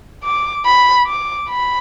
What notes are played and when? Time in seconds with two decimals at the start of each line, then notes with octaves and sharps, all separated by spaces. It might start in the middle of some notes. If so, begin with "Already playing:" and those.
0.23 D6
0.65 B5
1.07 D6
1.49 B5